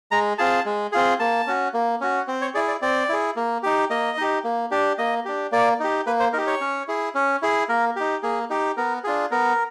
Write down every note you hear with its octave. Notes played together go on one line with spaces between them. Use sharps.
G#3 A#5
C4 F4 G#4 A5
G#3
C4 F4 G#4
A#3 A5
C#4 F#4
A#3
C#4 F#4
C4
C#5
E4 G#4 D5
D5
C4 D5
E4 G#4
A#3
D#4 G4
A#3 D#5
D#4 G4
A#3
D4 G4
A#3 D#5
D4 G4
A#3 D5
D#4 G4
A#3 B4
C5
D#4 G4 A#4
C#5
C#4
E4 G#4
C#4
E4 G#4
A#3 A#4
D#4 G4
A#3 G#4
D#4 G4
B3 A#4
D4 F4 G#4
B3 A#4